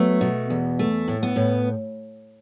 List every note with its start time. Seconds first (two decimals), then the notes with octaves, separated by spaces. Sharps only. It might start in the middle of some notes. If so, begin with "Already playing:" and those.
Already playing: F#3 A3 B3
0.21 B2
0.50 E2
0.79 A3
1.08 A2
1.23 B3
1.36 A2